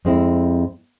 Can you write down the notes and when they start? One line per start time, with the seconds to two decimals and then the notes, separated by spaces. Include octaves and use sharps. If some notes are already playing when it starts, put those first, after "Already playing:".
0.05 F2 G#3 C4 E4